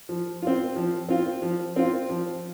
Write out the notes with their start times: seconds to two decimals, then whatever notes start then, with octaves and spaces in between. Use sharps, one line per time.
0.09 F3
0.42 C4 F4
0.76 F3
1.09 C4 F4
1.42 F3
1.76 C4 F4
2.09 F3